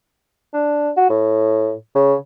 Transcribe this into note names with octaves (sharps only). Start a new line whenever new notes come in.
D4
F#4
A2
C#3